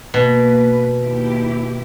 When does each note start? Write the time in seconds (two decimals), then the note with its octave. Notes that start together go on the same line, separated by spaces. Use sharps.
0.14 B2 A#3 B4
1.00 D#2 E4 G4